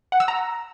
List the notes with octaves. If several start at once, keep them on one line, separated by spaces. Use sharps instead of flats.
F#5
E6
A#5